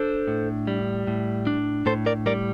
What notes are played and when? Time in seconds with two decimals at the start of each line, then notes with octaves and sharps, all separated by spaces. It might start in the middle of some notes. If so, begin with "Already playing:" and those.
Already playing: D4 A4 C5
0.27 A2
0.67 G3
1.07 A2
1.47 D4
1.86 A2 A4 C5
2.06 A#4 D5
2.26 G3 A#4 D5